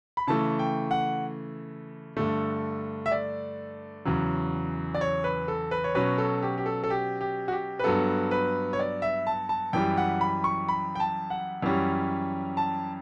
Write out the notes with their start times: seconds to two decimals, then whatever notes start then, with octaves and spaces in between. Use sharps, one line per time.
0.17 B5
0.27 C#3 E3 A3 A5
0.59 G5
0.91 F#5
2.17 G2 D3 A3
3.06 E5
3.12 D5
4.05 E2 C#3 F#3
4.94 D5
5.01 C#5
5.24 B4
5.48 A4
5.71 B4
5.84 C#5
5.95 B2 F#3 C#4 B4
6.18 A4
6.42 G4
6.58 G4
6.66 A4
6.84 A4
6.90 G4
7.21 G4
7.48 F#4
7.52 G4
7.79 B4
7.84 G2 F#3 B3 A4
8.31 B4
8.73 C#5
8.79 D5
9.02 E5
9.27 A5
9.49 A5
9.73 F#2 E3 G3 G5
9.97 F#5
10.21 B5
10.44 C#6
10.69 B5
10.95 G5
11.00 A5
11.30 F#5
11.62 F#2 E3 G3 C#4
12.57 A5